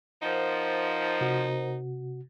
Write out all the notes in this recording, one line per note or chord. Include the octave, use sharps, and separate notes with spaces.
F3 D#4 A#4 C5 F#5
C3 F#4